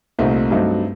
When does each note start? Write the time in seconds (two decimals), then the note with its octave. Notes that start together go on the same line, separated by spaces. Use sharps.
0.19 C2 A#2 A3 C4 D#4
0.51 G2 F#3 A3 C4 D#4